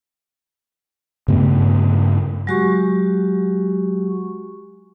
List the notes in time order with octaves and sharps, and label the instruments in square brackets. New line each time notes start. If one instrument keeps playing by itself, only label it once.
[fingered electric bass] G2 C#3 A3 B3
[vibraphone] F#3 G#3 F#4 G4 C#6